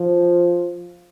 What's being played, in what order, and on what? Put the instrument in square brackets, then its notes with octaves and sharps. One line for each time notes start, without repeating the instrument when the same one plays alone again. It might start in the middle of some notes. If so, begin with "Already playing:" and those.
Already playing: [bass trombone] F3